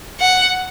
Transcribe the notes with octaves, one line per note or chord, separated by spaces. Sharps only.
F#5